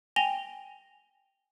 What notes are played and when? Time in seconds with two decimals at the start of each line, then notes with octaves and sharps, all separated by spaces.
0.16 G5 G#5 A#6 F7 G7